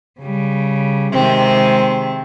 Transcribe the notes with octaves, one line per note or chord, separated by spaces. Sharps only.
C#3 G3
C3 D#3 G#3 C4